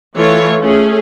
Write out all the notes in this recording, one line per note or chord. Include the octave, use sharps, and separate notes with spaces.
E3 A3 F4 C#5
A3 C#4 G#4